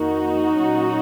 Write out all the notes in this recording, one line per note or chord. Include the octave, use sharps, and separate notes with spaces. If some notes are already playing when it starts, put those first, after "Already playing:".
Already playing: F2 D#3 A#3 D#4 F#4
A#2 F#3 C#4